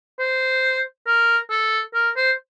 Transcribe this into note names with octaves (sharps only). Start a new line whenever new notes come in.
C5
A#4
A4
A#4
C5